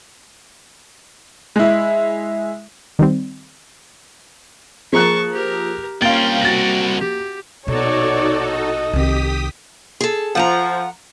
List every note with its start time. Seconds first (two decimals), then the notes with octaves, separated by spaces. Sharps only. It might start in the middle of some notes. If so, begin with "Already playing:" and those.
1.56 G#3 E4
2.99 D#3 G3 C4
4.93 F3 A#3 G#4 A5 A#5 C#6 F#6
5.32 G4 A#4
6.02 C2 A#3 C#4 F4 F5 G5 A6
6.42 F#4 A6 A#6
6.99 G4
7.67 A#1 B2 D#4 F#4 A4 C#5 D5
8.50 D#5
8.93 C2 D#3 G4 D#6 B6
10.01 G#4 A4
10.35 F3 F#5 A5 A#5